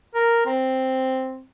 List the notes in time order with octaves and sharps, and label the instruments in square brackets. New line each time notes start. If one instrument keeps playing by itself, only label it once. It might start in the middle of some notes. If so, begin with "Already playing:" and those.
[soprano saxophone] A#4
C4